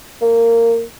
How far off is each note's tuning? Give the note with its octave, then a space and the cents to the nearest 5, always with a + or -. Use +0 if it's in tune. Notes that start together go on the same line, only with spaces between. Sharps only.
A#3 -15